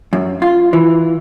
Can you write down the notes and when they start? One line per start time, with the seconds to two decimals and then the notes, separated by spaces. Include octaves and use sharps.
0.13 F#2
0.42 F4
0.73 E3